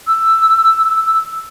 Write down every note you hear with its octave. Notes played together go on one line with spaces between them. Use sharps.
E6